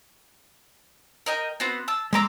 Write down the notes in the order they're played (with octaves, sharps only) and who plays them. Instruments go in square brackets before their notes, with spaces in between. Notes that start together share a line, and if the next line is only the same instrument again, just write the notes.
[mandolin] A#4 D#5 G5
B3 C4 F#4
A5 E6
[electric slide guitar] G#3 A#5 [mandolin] C6 D6 E6